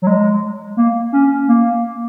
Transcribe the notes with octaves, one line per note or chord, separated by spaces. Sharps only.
F#3
G#3
A#3
C#4
A#3